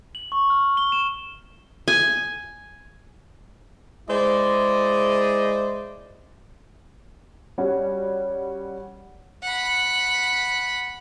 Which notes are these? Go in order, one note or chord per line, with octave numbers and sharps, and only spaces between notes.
F#7
C#6
F6
G7
E7
G#5
G#3 E4 C5 D5 D#5
G3 C#4 F#4
F#5 B5